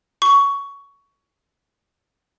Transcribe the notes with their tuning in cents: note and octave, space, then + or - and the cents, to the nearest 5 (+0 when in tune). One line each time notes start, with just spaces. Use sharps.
C#6 +15